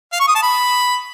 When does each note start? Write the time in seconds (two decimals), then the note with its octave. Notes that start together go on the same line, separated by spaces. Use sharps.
0.13 F5
0.20 C#6
0.28 D#6
0.35 A5
0.43 B5